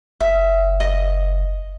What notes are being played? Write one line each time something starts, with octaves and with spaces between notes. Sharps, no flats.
F#1 E5
D#5